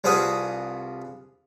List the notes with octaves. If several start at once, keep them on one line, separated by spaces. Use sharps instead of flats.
C2 F3 G#4 B4 F#5 D#6